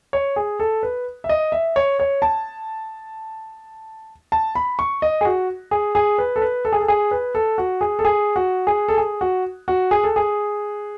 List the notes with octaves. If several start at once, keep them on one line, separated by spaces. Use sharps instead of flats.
C#5
G#4
A4
B4
E5
D#5
E5
C#5
C#5
A5
A5
B5
C#6
D#5
G#4
F#4
G#4
G#4
B4
A4
B4
A4
G#4
A4
G#4
B4
A4
F#4
G#4
A4
G#4
F#4
G#4
A4
G#4
F#4
F#4
G#4
A4
G#4